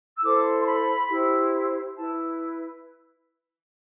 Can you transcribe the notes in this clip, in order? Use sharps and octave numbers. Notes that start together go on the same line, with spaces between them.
E6
E4 A4 C5 D6
C6
B5
E4 G4 C5
E4 B4 A5